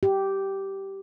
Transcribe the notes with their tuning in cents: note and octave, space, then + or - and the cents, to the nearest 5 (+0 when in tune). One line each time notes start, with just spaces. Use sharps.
G4 -10